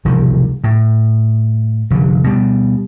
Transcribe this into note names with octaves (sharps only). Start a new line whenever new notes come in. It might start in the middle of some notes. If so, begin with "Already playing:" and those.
E1 C2 D#3 F3
A2
F1 D3
B2 G3